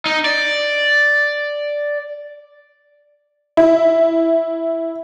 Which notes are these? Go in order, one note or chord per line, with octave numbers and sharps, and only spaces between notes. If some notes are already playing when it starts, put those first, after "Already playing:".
D#4
D5
E4